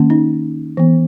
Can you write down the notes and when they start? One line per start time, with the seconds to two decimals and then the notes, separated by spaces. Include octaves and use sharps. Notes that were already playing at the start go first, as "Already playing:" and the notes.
Already playing: D#3 A#3 C#4
0.10 D#4
0.77 E3 B3